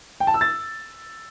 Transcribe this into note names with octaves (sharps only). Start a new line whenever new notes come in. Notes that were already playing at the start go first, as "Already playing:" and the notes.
G5
A5
E6
A6